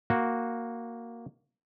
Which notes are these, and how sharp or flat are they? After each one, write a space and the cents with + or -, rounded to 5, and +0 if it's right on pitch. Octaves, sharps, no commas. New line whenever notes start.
A#3 +0 F#4 -5